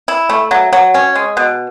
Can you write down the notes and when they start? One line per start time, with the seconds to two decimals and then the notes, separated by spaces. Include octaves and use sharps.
0.08 E4
0.30 A3
0.51 F#3
0.73 F#3
0.94 C#4
1.15 G#3
1.37 B2